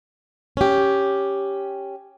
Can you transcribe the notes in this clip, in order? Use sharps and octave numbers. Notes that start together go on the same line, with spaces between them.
C#4 G4